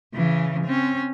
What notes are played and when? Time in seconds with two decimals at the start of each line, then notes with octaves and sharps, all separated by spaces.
0.14 C#3 E3
0.65 C4 C#4